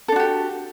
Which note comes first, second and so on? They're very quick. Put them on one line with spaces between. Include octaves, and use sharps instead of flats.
A4 D4 F#4 G4